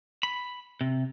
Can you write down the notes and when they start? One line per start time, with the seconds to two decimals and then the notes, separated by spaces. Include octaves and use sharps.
0.23 B5
0.81 C3